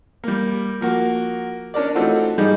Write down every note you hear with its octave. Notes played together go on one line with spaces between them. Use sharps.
G3 A#3
F3 A#3 F#4
C#4 D4 A#4 D5
E3 A3 C4 D#4 F4 F#4
G#2 G3 G#3 D#4